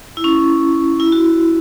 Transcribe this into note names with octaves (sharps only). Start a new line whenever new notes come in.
E4
C#4
E4
F#4